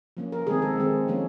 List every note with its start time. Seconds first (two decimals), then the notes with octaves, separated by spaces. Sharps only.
0.17 F3 A#3 C#4
0.32 A#4
0.47 D#3 G#3 C4 G#4
0.62 A4
0.77 D#3 G#3 C4
1.08 F3 A#3 C#4